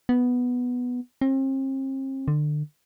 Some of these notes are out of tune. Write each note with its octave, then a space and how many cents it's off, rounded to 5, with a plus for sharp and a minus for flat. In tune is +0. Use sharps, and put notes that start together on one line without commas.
B3 +0
C4 +40
D3 +30